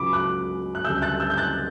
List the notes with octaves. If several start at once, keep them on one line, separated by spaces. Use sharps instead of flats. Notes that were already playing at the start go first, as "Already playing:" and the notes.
Already playing: C#2 C#3 F#3 B5 D6
D6 F#6
F#6
D2 C#3 G3 E6 G6
F#6 A6
E6 G6
G6
F#6 A6